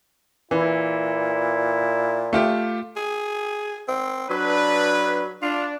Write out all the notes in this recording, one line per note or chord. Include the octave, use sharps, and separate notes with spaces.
A#2 E3 E4
A3 F4 G4
G#4
C4
F#3 D4 B4
D4 F4